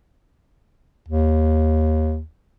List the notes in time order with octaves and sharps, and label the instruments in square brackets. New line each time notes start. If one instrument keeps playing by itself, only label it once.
[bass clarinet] D#2